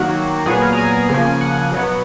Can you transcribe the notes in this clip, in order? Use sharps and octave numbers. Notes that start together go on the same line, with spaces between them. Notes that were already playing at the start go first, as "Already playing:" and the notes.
Already playing: D#3 F#3 A#3 F#4
A#2 F#3 B3 G#4
A#4
A#5
G#5
C#3 F3 A#3
F#5
B2 F#3 B3